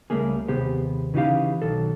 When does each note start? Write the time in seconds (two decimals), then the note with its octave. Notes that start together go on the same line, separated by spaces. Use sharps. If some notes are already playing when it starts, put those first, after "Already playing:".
0.10 C#2 G3 A3 A#3 G#4
0.48 D#2 C3 B3 G4 G#4 C5
1.14 C#3 E3 D#4 F#4 G4 F5
1.62 B1 D#3 A4